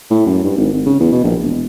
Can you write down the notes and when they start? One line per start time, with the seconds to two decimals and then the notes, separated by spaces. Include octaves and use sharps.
0.10 A2
0.26 F#2
0.44 G2
0.57 G#1
0.73 G#1
0.86 C#3
1.00 E2
1.12 B2
1.23 A#1
1.42 E1